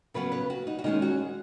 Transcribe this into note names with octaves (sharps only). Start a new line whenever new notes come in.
C#3 F#3 B3 B4
B4
F#4
D#4
F#4
D#3 G#3 C#4 D#4
F#4